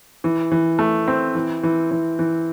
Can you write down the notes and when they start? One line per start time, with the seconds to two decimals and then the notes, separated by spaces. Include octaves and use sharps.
0.24 E3
0.52 E3
0.79 A3
1.08 C4
1.35 E3
1.63 E3
1.91 E3
2.19 E3